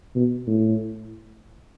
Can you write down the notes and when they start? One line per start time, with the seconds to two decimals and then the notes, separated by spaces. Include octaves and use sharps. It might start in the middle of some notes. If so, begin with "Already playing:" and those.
0.16 B2
0.47 A2